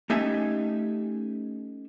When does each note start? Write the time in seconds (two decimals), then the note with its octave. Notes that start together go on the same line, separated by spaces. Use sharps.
0.10 A3 C#4 D#4 G4 E5 G#5